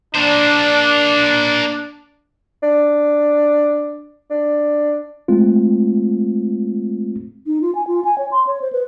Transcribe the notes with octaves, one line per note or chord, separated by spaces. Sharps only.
A#3 D4 C5
D4
D4
G#3 A3 C4 F4
D#4
F4
G#5
F4
G#5
C#5
C6
C#5
C5
B4